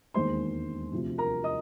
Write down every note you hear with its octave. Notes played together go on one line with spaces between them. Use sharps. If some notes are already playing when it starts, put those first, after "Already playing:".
E1 D#2 D#3 G#3 C5 C6
D2 C3 F3
A#4 A#5
D#5 D#6